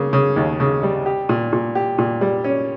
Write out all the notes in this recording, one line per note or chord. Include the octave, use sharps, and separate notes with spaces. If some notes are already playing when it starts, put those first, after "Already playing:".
Already playing: C#3 A#3
C#3
D#2
C#3
G3
G4
A#2
A#2
G4
A#2
G3
C#4